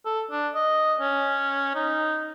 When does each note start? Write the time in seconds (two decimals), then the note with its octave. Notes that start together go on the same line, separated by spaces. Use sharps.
0.06 A4
0.31 D4
0.55 D#5
1.00 C#4
1.75 D#4